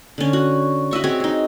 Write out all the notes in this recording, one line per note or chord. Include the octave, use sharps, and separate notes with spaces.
D3 C#4
F#4
F#4 D#5 E5 C#6
C4 F#4 G#4 C#5
D#4 G#4